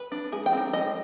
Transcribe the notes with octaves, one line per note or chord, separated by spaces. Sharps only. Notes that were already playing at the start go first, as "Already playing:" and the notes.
Already playing: B4
D4
G#3 G#4
G5
C4 D#4
G#3 D#5